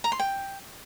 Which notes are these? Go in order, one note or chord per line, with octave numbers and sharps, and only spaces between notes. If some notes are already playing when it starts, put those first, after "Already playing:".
A#5
C6
G5